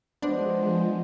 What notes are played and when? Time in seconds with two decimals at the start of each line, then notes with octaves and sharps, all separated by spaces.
0.22 F3 G#3 B3 D4 C5 D#5